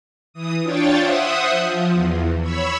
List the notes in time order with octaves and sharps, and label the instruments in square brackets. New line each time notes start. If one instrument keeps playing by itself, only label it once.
[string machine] E3 D#6
D4 F4 C#5 G5 A6
C5 E5 F#5 D#6
F3
E2
C#5 B5 E6